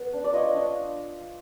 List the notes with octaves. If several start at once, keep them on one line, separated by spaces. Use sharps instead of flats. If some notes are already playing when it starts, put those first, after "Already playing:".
Already playing: B3
D4
D5
F4 C#5 D#5
D4